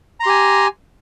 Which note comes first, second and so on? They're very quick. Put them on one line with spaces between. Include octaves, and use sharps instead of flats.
A#5 C6 G4 G#5